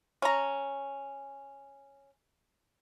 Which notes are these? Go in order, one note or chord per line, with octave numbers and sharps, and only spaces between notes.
C#4 A#5